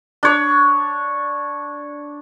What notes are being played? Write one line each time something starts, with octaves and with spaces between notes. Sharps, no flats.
D4 C#5